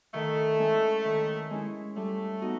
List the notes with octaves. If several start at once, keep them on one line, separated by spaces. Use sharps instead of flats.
D#3 A3
G#3 C#4 E4
D#3
G#3 C#4 E4
G3 A3
B3 D#4 F#4